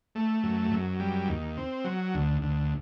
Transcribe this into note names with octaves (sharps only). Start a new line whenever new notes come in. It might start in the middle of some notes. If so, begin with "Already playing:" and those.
A3
F#2
F#2
G3
D#2
C4
F#3
D2
D2